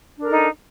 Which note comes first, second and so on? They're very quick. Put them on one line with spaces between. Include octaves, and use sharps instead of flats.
D4 A#4 A4 D#4